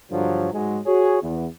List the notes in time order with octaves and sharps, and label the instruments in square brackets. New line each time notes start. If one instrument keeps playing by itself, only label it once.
[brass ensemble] G2 D3 F3 F#3
G#2 F#3 G#3
F#4 G#4 C#5
E2